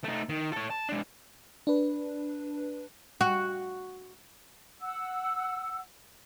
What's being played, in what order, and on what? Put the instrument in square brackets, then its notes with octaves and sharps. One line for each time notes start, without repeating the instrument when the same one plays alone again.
[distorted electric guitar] A3 D#4
D#3
A4 C#5
A5
G#3 D4
[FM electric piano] D4 B4
[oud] F#4
[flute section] F#5 E6